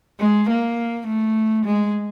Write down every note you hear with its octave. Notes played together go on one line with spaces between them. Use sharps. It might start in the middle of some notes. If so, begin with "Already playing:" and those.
G#3
A#3
A3
G#3